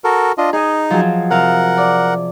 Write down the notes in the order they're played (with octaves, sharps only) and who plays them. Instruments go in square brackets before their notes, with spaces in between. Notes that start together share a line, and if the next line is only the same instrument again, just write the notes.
[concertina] F#4 A4 A#4
D4 F4 D#5
[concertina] D#4 [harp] G#4 D#5
[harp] F3 F#3 G#4
[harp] C3 F5 [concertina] A#4 F#5
[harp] D5